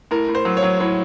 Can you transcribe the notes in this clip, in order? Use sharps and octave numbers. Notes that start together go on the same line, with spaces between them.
A2 A#4
A2
C5
F#3
C#5
F#3
A2 C#5